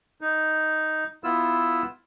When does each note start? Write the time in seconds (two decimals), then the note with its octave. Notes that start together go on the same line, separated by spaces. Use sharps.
0.21 D#4
1.24 B3 E4 F4 E6